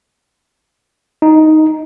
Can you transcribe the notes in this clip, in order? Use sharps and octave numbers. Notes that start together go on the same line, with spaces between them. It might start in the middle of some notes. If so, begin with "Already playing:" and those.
D#4